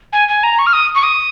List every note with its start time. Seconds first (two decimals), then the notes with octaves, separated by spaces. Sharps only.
0.13 G#5
0.28 G#5
0.43 A#5
0.59 C#6
0.66 F6
0.73 D#6
0.95 C#6
1.03 D#6